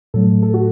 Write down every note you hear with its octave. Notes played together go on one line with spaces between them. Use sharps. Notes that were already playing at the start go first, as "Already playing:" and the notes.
A2 F#3 A3 A4
A4
F#4